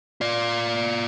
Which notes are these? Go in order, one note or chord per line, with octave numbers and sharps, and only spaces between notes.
F4 D5